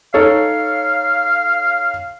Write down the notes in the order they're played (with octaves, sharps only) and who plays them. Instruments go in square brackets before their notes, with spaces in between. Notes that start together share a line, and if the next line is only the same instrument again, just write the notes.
[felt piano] D#4 A4 C#5 [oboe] F5